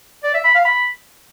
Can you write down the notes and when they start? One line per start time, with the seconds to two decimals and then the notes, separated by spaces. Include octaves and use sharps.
0.24 D5
0.34 E5
0.44 B5
0.55 F5
0.65 B5